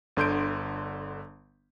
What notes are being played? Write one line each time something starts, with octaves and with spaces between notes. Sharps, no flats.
G1 D3 C6 G6 D7